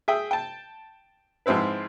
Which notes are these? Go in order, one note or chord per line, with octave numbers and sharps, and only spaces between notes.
G#4 E5 G5
G5 A5
G#2 F3 C4 E4 B4